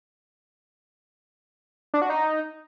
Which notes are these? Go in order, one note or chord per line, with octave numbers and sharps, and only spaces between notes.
D4
F#4
D#4